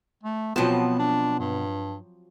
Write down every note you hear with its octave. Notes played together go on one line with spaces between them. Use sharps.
A3
B2 F3 F#3 B3 C4 A5
D4
G2